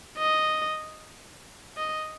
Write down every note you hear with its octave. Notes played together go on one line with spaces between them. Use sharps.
D#5
D#5